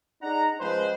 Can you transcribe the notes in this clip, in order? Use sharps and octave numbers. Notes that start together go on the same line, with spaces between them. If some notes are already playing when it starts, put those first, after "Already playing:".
D4 D#4 G#4 F#5 A#5
C#2 F3 G#3 B4 C5